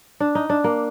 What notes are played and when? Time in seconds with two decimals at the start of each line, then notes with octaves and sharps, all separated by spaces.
0.20 D4
0.35 D#4
0.50 D4
0.64 A#3